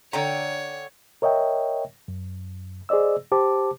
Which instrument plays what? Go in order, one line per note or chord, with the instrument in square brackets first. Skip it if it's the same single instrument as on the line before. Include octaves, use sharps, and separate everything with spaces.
[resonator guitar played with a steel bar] D3 G5 A#5 [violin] C#5
[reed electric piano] A#4 C#5 D#5 E5 G5
F#2
G#4 C5 D5 D#5 E6
G4 C5 A5 D6